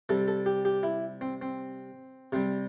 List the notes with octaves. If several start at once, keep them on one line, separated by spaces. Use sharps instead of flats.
C3 G3 A4
A4
G4
G4
E4
C4
C4
C3 G3 C4